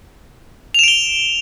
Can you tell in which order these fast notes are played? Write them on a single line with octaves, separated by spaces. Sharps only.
F7 E7 D7 G7